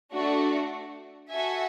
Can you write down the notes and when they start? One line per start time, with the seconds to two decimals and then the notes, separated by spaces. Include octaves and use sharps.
0.13 A3 D4 F#4
1.31 F#4 A4 E5 G#5